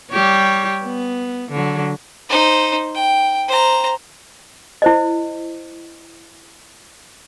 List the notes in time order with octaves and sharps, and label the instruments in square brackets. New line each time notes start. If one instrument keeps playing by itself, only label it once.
[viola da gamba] G3 G4 C#5
B3
D3 F#3
[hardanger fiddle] D#4 C5
G5
C5 A#5
[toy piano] E4 C5 D#5